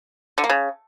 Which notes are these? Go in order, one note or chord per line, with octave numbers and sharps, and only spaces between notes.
D3
A#3
C#3